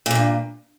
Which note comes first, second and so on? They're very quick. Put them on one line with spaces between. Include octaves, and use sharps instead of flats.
A#2 E2 G2